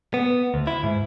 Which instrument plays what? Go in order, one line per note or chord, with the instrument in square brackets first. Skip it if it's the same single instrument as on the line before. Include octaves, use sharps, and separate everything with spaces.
[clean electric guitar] B3
D2
E4
G#2